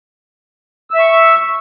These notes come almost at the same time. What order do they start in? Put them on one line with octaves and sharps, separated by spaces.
E6 E5 C#6